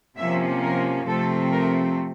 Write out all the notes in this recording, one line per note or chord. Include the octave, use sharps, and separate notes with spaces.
C3 F3 A#3 C#4 E5
A#4
C3 F3 A3 C4 A4
A#4